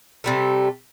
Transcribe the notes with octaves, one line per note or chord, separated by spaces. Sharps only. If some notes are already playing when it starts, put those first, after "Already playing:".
C3 G3 A3